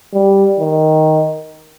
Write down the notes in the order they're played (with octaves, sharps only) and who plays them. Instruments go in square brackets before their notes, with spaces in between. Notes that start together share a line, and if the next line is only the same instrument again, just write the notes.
[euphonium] G3
D#3